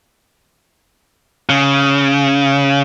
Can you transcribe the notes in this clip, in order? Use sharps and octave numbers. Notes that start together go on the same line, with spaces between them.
C#3